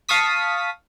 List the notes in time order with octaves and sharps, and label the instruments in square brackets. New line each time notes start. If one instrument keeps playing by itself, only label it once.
[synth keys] F5 A5 C#6 D#6 B6